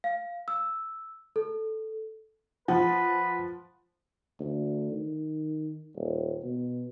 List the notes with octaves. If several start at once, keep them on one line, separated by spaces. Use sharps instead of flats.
F5
E6
A4
F3 B4 F#5
D2
D#3
D#1
B2